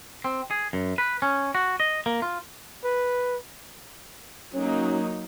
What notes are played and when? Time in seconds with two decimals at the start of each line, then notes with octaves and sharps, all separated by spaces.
0.24 C4
0.51 G#4
0.73 F#2
0.98 B4
1.22 C#4
1.55 F#4
1.80 D#5
2.06 A#3
2.22 F4
2.84 B4
4.54 F#3 A#3 C#4 D#4